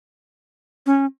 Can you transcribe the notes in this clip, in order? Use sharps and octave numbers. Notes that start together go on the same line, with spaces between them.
C#4